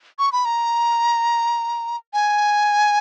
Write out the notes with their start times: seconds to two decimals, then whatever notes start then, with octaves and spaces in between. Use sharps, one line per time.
0.19 C#6
0.33 B5
0.45 A#5
2.14 G#5